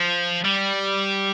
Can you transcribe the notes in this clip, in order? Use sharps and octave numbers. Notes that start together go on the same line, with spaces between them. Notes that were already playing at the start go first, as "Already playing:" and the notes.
Already playing: F3
G3